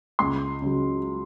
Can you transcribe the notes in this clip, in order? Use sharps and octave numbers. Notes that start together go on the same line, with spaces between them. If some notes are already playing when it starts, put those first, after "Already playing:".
C#2 C6
C#3 F#3